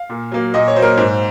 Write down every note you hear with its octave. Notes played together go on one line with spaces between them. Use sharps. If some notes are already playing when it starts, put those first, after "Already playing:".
Already playing: F5
A#2
F#3 A#3
A#2 D#5
C#5
F#3 A#3 A#4 C5
G#2 C5